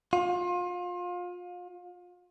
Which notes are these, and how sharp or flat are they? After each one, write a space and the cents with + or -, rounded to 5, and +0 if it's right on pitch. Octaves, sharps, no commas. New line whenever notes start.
F4 +30